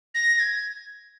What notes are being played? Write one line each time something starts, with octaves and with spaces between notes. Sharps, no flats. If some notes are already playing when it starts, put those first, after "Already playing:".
A#6
G#6